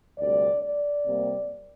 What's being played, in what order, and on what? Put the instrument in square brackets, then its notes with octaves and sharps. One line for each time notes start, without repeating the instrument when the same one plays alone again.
[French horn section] D2 C3 G3 D5
D5
C3 G3 A#3